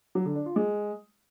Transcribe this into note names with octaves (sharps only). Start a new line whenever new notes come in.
F#3
D3
D4
F4
G#3